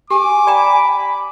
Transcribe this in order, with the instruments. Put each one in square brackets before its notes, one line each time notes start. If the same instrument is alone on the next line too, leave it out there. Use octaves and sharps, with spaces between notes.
[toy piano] G4 [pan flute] G#5 [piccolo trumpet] D6
[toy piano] D5 G5 A#5 [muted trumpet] B5